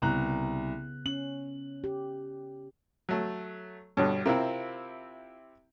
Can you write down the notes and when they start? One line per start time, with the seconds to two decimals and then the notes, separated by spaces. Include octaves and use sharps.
0.02 C2 C#3 B3 A#5 F#6
1.06 C#4 F#7
1.84 G4
3.09 F#3 A3
3.97 G2 B2 D3 C#5
4.26 C3 C4 E4 F4 A#4